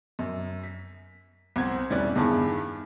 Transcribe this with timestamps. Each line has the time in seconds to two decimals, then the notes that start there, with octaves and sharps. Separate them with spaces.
0.19 F#2
0.64 B6
1.56 C2 C4 F#5 G#6
1.90 E1 G3 C#4 E4 D5 F#6
2.15 E2 G2 D#3 E4 G#4 A5